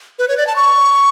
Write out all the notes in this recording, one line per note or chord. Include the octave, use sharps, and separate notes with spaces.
B4
C#5
D5
A5
C#6